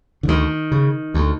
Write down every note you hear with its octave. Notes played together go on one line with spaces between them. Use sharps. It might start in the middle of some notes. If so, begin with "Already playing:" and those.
D3
D2 D#3
C#3
D2